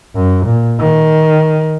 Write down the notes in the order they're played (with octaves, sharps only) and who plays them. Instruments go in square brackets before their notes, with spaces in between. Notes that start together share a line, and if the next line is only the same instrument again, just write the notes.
[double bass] F#2
A#2
D#3